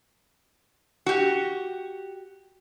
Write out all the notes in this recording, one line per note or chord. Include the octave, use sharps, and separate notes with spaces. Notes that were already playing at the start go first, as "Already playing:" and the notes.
F#4 G4